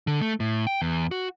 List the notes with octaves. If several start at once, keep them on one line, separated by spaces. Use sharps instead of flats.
D3
A3
A2
G5
E2
F#4